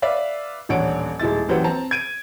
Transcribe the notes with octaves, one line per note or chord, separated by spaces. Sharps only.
B4 D5 E5 F5
D#1 A1 D4 C#5 F#5 D7
D#1 G#3 E4 A6
A#1 F#2 E3 G4 C5 F#5
C4 A5 A#5
G#6 D7 D#7